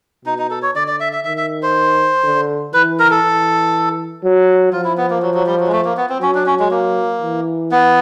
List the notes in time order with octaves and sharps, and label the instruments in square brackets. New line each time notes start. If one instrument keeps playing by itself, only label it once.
[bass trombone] B2 [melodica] D#4
[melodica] D#4
A4
C#5
[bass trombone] D3 [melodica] D5
[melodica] D5
E5
E5
[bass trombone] D#3 [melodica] E5
[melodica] E5
C5
[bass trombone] D3
[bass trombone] E3 [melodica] B4
[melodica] A#4
A4
[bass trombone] E3
F#3
[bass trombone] F3 [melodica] F4
[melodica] E4
B3
A#3
F#3
F#3
G3
F#3
G#3
A3
A#3
B3
C4
[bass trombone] F#3 [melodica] C#4
[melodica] D4
C#4
G#3
A#3
[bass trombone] E3
[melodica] B3